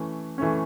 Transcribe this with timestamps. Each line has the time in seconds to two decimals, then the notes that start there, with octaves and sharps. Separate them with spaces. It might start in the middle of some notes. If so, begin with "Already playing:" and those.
Already playing: E3 A3 C#4
0.38 E3 A3 C#4